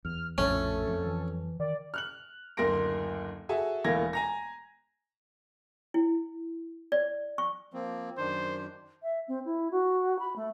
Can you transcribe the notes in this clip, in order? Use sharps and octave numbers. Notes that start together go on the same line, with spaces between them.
E2 F6
A#1 F2 A2 A3 C#4 A4
F2
E3
D#3 D5
F6 F#6 F#7
F#1 D2 A#4 C6 A#6 D7
F#4 G#4 A4 E5 G#5 A5
E1 E2 A3 A#3 G#6 A#6
G#5 A#5 A#6
E4
D5
C#6
F3 A#3 C4
F#2 D#3 D4 C5
E5
C4
E4
F#4
B5
A3